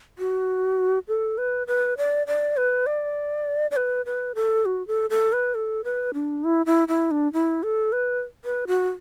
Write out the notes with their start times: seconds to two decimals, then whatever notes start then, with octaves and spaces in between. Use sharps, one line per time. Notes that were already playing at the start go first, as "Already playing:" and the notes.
0.19 F#4
1.08 A4
1.38 B4
1.67 B4
1.98 D5
2.27 D5
2.57 B4
2.86 D5
3.71 D5
3.76 B4
4.06 B4
4.35 A4
4.65 F#4
4.87 A4
5.10 A4
5.33 B4
5.55 A4
5.84 B4
6.14 D4
6.44 E4
6.66 E4
6.88 E4
7.11 D4
7.33 E4
7.63 A4
7.92 B4
8.45 B4
8.67 F#4